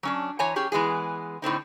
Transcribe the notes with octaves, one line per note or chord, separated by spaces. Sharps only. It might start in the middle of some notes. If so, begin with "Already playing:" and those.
F#3 C#4 D4
E3 C#5 G#5 A#5
C#4 G4 G#4
E3 G#3 B3 G#4
A2 D3 C4 D#4